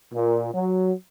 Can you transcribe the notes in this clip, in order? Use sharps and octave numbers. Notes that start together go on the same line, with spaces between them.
A#2
F#3